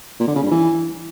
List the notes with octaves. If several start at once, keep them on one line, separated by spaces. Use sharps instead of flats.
A#2
D3
C#3
G2
E3